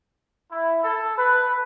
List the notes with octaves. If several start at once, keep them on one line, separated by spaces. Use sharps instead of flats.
E4
A4
B4